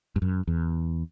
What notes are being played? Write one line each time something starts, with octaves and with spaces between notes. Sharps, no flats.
G2
F#2
E2